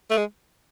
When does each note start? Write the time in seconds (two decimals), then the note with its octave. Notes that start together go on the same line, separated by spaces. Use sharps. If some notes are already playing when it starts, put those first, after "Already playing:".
0.11 A3
0.17 G#3